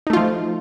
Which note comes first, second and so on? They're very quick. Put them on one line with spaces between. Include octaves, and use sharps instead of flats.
D#4 A3 F4 F3